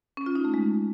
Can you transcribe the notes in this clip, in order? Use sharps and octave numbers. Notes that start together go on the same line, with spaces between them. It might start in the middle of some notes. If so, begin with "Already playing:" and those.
C#4
F4
D#4
A3
G#3